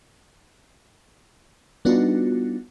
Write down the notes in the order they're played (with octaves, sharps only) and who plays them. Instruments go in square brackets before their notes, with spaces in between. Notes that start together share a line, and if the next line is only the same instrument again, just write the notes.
[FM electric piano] G3 B3 D4 D#4 F4 F#4